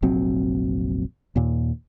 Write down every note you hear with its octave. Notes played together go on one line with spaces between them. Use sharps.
F1 A#1 F#3 C4
D#2 A#2